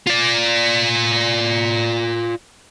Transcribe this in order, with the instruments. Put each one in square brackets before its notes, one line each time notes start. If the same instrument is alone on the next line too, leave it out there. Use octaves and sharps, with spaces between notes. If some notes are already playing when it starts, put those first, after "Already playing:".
[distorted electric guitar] F4 D5